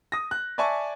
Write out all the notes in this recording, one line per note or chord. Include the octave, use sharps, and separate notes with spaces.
D#6 A#6
F#6
D5 E5 G#5 A5 C#6